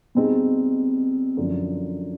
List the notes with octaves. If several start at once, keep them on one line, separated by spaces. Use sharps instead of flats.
B2 G3 C4 D#4 G#4
F#2 D3 F3